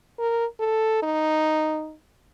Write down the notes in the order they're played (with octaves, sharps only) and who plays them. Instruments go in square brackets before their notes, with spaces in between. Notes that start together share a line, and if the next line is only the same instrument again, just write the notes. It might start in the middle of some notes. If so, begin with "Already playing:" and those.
[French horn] A#4
A4
D#4